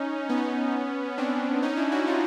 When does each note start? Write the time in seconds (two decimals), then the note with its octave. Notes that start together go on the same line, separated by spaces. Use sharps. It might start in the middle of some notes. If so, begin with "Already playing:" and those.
Already playing: C#4 D#4
0.29 B3 C#4
1.18 C4 D4
1.62 C#4 D#4
1.77 D4 E4
1.92 E4 F#4
2.07 D#4 F4